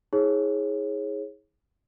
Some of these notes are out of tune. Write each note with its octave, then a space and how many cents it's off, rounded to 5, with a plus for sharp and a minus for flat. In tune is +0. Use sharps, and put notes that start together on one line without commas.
E4 -45 G#4 +5 C#5 -30